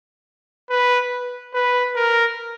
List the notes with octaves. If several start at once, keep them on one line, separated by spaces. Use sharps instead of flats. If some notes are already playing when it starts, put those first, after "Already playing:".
B4
B4
A#4